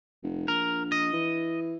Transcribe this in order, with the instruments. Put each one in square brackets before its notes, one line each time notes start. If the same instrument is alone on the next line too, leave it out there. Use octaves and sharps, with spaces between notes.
[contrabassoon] F1
[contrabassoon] A#1 [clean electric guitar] A#4
[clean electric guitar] D#5
[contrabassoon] E3